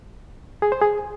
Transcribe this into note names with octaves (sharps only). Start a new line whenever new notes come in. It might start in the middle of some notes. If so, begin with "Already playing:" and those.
G#4
C5
G#4